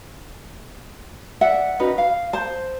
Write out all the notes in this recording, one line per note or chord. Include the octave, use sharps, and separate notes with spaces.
D5 E5 F#5
C#4 D#4 F#4 B4
F5
C5 A5